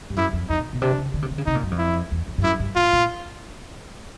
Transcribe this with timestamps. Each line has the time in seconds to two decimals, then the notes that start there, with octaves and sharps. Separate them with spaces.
0.10 G2
0.17 F#2 E4
0.33 F2
0.49 F2 D#4
0.58 A#2
0.73 B2
0.82 C3 D4
0.98 C#3
1.14 D3
1.22 C3
1.30 D3
1.38 C#3
1.46 C3 D#4
1.55 A#2
1.63 F#2
1.71 F2
1.78 E4
2.11 E2
2.28 F2
2.38 G2
2.43 F#2 E4
2.60 G2
2.75 A2 F4
2.93 A#2